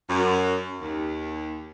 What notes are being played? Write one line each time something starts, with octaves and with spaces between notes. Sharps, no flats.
F#2
D#2